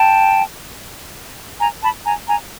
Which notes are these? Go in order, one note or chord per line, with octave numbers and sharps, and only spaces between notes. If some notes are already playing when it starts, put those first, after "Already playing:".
Already playing: G5 A5
G#5 A#5
A5 B5
G#5 A#5
G#5 A#5